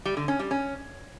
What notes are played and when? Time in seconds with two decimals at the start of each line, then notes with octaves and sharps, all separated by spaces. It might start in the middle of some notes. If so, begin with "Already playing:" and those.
0.05 G3
0.17 D3
0.28 C#4
0.39 G3
0.51 C#4